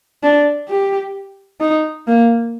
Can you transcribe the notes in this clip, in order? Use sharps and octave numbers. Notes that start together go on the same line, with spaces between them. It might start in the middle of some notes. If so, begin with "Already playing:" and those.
D4
G4
D#4
A#3